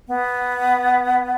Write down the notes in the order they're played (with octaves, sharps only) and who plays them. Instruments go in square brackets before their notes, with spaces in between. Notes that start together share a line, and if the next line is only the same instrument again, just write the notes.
[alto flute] B3